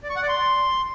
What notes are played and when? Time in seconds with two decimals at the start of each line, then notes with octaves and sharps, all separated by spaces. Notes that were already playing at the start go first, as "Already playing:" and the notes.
0.03 D5
0.10 C#6
0.16 F#5
0.22 D5
0.29 C6